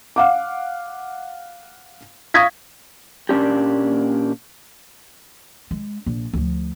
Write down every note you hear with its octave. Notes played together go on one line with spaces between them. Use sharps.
F5 F#5 D6
F5 C#6 D#6 G#6 A#6 B6
A#2 A#3 C#4 D4 G4
G#3
A#1
D2 F3